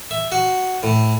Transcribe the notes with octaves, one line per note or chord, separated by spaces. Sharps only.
E5
F#4
A2